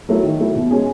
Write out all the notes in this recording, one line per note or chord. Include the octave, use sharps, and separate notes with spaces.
F#3 A3 E4
D#3
F#3 A3 E4
B2
G#3 C#4 G#4